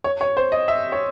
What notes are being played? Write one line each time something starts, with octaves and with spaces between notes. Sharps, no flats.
C#5
C#5
C5
D#5
E5
C#5